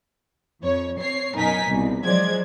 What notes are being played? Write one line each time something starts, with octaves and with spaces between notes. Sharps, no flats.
F2 C#5
C4 C#5 C7
F#2 B2 D#4 A#4 G#5 B6
C2 B2
F3 F#3 G#3 C5 D5 G#6